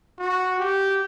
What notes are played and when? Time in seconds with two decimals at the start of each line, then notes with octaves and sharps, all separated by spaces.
0.19 F#4
0.59 G4